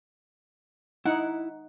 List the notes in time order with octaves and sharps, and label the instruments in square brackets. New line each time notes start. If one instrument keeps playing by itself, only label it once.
[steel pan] D#4 F#5 [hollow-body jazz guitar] E4